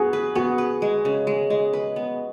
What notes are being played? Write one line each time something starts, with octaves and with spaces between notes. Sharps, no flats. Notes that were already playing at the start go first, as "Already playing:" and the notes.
Already playing: B3 F#4 G#4
B4
B3 F#4
B4
G#3
C#3
G#3
G#3
B4
B3